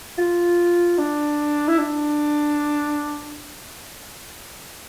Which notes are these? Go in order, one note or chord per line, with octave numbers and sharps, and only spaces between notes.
F4
D4
E4
D4